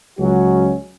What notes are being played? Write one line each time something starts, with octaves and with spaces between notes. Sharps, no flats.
C#2 F#3 C#4 F#4